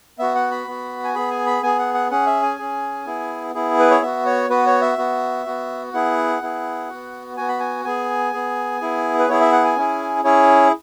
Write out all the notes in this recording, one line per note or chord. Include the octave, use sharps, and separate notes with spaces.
B3 F#4 E5
F#5
B5
B3 F#4
G#5
B3 G#4 B5
G#5
B5
B3 G#4 G#5
F#5
F#5
C#4 G#4 F#5
E5
G#5
C#4 G#4
B3 E4 G#4
B3 E4 G#4
B4
C#5
B3 F#4 E5
C#5
B3 F#4 B4
C#5
E5
B3 F#4
B3 F#4
B3 E4 G#4 F#5
B3 E4 G#4
B3 F#4
B3 F#4 G#5
B5
G#5
B3 G#4 G#5
B3 G#4
B3 E4 G#4
B4
B3 E4 G#4 C#5
E5
F#5
G#5
C#4 E4 G#4
C#4 E4 G#4 C#5